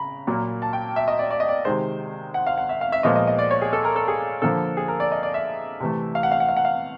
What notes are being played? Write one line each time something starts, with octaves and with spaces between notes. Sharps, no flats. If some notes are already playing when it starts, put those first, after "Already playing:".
Already playing: C#3 A#5 B5
A#2 F#3 A#3
A5
G5
E5
D#5
D5
D5
D#5
D5
C3 D#3 G#3 C5
F#5
F5
F#5
E5
F5
E5
A#2 F3 G#3 B3 D#5
D#5
D#5
D5
C#5
G#4
A4
A#4
A4
G#4
D3 F3 A#3 A4
G#4
A#4
D5
D#5
D5
E5
C3 E3 A3
F5
F#5
F5
F#5
F5
F#5
F5